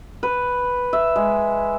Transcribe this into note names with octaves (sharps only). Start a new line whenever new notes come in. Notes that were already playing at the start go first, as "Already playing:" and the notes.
B4
E5
G#3